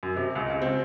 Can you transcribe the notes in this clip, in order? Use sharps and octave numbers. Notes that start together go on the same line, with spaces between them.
F#2
C3
C#2
C#2
C4